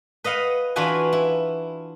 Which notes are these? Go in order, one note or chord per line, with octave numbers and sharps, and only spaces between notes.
B4 D#5 F5 F#5
E3 D4 F4 F#4 B4 G#5
E4